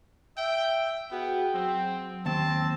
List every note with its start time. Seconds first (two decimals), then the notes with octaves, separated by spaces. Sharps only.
0.38 E5 G5
1.11 B3 F#4 G#4 F#5 G5
1.54 F#3 C4
2.26 D#2 C4 A5